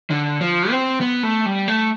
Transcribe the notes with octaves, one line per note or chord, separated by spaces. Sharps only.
D3
F3
C4
B3
A3
G3
A3